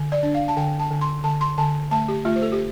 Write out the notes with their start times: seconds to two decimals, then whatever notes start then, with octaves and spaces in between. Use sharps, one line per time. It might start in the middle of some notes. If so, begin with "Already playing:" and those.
Already playing: D3
0.12 D5
0.23 D4
0.34 F5
0.48 A5
0.57 D3 G5
0.80 A5
0.91 D3
1.01 C6
1.24 D3 A5
1.41 C6
1.58 D3 A5
1.91 A3 A5
2.08 G4
2.25 A3 F4
2.36 C5
2.42 A4
2.52 G4